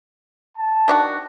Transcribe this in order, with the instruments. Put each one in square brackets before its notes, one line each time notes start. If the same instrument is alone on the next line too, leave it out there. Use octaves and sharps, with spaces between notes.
[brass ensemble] A5
[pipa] D#3 D4 F#4